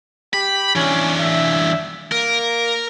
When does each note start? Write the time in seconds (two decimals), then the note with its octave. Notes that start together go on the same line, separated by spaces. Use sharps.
0.34 G4 B5
0.76 E3 C#4 D4
1.19 E5
2.12 A#3 A#4